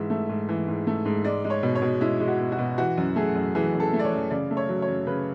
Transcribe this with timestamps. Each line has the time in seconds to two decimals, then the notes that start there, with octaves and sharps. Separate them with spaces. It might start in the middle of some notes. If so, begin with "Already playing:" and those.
Already playing: G#2 E3 E5
0.10 A3
0.29 G#2
0.49 E3
0.68 G#2
0.87 A3
1.05 G#2
1.24 G#3 D5
1.44 G#3
1.50 C#5
1.63 B2
1.75 C#5
1.82 B2
2.01 G#3 E4
2.20 G#3
2.27 F#4
2.40 B2
2.52 F#4
2.59 B2
2.78 E3 F#4
2.98 F#2
3.16 A3 G#4
3.36 F#2
3.55 E3 G#4
3.74 F#2
3.80 A4
3.93 A3
3.99 D5
4.05 C#5
4.12 F#2
4.30 C#3 D5
4.51 A3
4.57 C#5
4.69 F#3
4.82 C#5
4.88 F#2
5.07 C#3 B4